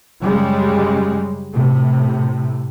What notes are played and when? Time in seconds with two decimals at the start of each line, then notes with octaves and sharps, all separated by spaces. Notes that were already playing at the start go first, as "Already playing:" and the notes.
0.22 F#2 C#3 G3 G#3
1.53 A2 C3